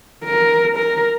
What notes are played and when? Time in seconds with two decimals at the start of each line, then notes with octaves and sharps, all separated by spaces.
0.25 A#4
0.76 A#4